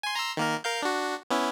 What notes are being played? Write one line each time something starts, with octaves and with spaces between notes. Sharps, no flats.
G#5 C6
A#5 C6 E6
D#3 A#3 A#4
A#4 F5 G6
D4 F#4
B3 C#4 E4